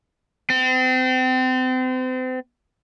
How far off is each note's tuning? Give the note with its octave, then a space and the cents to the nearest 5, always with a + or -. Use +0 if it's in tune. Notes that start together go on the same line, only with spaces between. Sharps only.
C4 -35